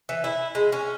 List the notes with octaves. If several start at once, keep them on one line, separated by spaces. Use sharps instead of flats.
E3
E4
G#3
C#4